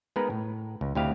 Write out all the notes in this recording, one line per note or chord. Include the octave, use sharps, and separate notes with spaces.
G#3 B3 D#4 A#4 B4
A2
C#2
D2 C4 E4 G4 D#5 F5